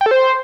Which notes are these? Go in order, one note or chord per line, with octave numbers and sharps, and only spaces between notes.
G5
A4
C5